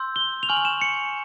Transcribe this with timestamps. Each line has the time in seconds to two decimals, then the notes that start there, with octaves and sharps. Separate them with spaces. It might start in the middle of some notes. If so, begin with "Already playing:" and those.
Already playing: C6 E6 G6
0.16 G7
0.43 F7
0.49 G#5 C#6 F6 F#7
0.57 F7
0.65 E7
0.81 C#7